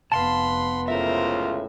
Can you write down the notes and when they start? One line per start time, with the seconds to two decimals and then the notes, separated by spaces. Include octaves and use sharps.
0.12 F1 B3 F5 F#5 A5 B5 C6
0.88 C#2 A2 F4 A#4 C5 E5